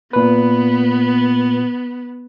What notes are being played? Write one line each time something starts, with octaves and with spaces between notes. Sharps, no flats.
A#2 B3 B4